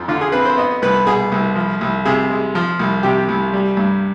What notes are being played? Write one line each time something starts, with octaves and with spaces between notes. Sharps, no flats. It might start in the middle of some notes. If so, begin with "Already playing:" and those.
Already playing: F2 F3
D3 F4
G#4
C4 B4
C5
B3 D#5
C2 B4
B2 G#4
C2
F3
C2
C3 G#4
G#3
F3
C2
C3 G4
C2
G3
G2